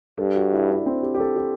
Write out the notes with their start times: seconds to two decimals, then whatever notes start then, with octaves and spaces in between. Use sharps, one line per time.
0.18 G2 A4
0.35 F#4
0.53 E4
0.69 D4
0.86 C4
1.03 G4
1.14 G4
1.20 A4
1.36 G4